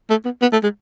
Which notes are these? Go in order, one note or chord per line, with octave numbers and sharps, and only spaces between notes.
A3
B3
B3
A3
G#3